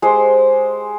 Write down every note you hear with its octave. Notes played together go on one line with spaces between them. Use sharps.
G#3 G4 C5